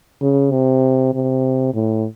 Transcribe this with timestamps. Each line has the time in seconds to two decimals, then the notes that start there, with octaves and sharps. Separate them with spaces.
0.22 C#3
0.52 C3
1.14 C3
1.74 A2